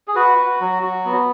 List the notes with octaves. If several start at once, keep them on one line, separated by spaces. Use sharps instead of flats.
G#4
F#4 B4
F#4
F#3
F#4
B3